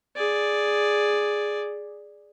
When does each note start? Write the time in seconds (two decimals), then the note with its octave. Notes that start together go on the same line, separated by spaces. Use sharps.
0.17 G#4 D5